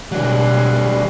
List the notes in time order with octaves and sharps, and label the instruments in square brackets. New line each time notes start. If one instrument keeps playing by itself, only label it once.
[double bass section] B2 [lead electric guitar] D3 F#3 [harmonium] G3